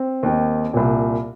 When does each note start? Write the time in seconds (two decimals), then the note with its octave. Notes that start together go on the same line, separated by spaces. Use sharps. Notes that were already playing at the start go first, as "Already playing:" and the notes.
Already playing: C4
0.23 D#2 D#3
0.74 C2 A#2